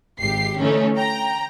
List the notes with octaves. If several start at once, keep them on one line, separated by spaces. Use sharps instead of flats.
G#1 G4 C7
D3 E3 A3 C#4 D#4
G5 A#5